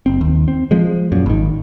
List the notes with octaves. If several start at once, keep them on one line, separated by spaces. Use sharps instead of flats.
F#1 C4
D#2
C4
F3 G#3
F#2 A#2
G#1 D#3